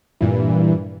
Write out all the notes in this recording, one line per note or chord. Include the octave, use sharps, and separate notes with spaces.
G2 A#2 E3